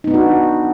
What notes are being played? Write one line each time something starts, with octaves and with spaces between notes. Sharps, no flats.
B3 D4 D#4 F#4